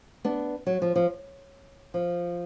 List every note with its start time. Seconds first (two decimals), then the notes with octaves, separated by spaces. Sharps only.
0.25 B3 D4
0.67 F#3
0.82 F3
0.96 F3
1.94 F3